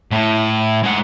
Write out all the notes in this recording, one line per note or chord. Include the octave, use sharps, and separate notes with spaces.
A2
G#3 F#5